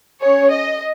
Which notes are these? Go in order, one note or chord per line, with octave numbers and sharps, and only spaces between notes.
C#4 G#4 C#5
D#5